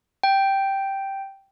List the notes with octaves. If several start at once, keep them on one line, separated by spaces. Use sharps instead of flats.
G5